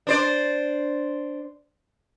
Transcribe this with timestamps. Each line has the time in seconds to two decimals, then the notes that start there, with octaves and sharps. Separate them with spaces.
0.07 D4 C5 D5